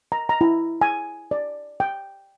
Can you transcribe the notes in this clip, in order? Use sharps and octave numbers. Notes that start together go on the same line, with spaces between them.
A#5
A#5
E4
G#5
D5
G5